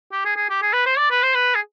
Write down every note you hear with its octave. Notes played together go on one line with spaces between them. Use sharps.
G4
G#4
G#4
G4
G#4
B4
C5
D5
B4
C5
B4
G#4